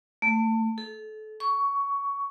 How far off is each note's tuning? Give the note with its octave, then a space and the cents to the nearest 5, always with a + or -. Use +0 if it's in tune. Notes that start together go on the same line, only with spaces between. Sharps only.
A3 +25
A4 -30
C#6 +15